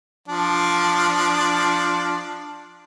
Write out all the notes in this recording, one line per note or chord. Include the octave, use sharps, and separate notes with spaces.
F3 D4